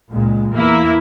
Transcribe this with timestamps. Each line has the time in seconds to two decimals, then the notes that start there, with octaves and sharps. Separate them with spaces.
0.12 C#2 A#2 G#3
0.54 E2 E3 A#3 E4